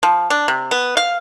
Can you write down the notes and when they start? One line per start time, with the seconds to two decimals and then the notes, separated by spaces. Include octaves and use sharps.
0.03 F3
0.30 D4
0.48 C3
0.71 B3
0.97 F5